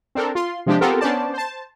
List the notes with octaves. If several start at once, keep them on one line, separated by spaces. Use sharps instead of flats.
C4 D4 A4 A#4
F4 C6
C3 F3 G#3 D4 G4
B3 C4 F4 G4 A4 A#4
B3 C#4 D4 C5 D5 A5
C5 A5